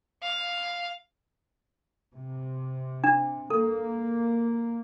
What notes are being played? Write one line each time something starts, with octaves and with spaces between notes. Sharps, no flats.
F5
C3
D4
A#3 A4